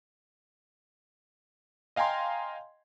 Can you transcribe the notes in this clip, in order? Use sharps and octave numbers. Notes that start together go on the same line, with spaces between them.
D#5 F5 G5 G#5 A#5 C6